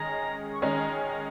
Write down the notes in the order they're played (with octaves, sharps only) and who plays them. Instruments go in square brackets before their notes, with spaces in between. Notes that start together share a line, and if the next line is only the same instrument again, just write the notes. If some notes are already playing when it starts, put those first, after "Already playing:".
Already playing: [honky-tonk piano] D#3 G#3 C#4 G#4 D#5 [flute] A#5
[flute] C#6
[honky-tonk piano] D#3 G#3 C#4 G#4 D#5 [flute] A#5
[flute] A#5